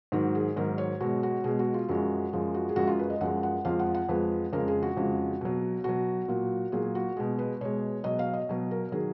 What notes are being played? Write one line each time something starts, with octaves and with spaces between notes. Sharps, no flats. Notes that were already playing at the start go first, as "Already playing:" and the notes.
G#2 D#3 F#3 F#4
G#4
G#2 D#3 F#3 A#4
C#5
B2 G#3 F#4
F#4
B2 G#3 G#4
F#4
F4
F#2 F3 G#3 F#4
F#2 F3 G#3
F#4
G#4
F#2 F3 G#3 F#4
F4
B4
D#5
F#2 F3 G#3 F#5
F#5
F2 F3 G#3 F5
F#5
F#5
F2 F3 G#3 B4
F2 C#3 G#3 A#4
G#4
F#4
F2 C#3 G#3
B2 F#3
B2 F#3 F#4
A#2 F#3
A#2 F#3 G#4
F#4
B2 G#3
B4
B2 G#3 C#5
B2 F#3 D#5
F5
D#5
B2 F#3
A#4
D#3 F#3 G#4